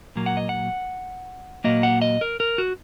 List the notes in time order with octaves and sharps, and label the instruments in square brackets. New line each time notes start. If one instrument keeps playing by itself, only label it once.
[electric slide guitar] A#2 F#3 A#3
F#5
D#5
F#5
A#2 F#3 A#3 D#5
F#5
D#5
A#4
A#4
F#4